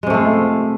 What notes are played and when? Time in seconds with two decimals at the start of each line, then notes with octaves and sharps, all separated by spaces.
0.03 G#3
0.07 C3
0.10 A3
0.14 F4